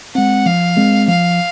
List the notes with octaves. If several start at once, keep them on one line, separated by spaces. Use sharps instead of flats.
G#3 C4 F#5
F3 F5
G#3 C4
F3 F5